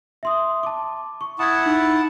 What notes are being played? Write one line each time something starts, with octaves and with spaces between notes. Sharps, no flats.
E5 C6 D#6
A5 D6
C#6
E4 F#5 A5 D#6 G#6
D#4